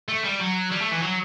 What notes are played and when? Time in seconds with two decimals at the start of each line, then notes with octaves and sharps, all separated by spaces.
0.09 A3
0.25 G3
0.41 F#3
0.72 G3
0.82 A3
0.92 E3
1.03 F#3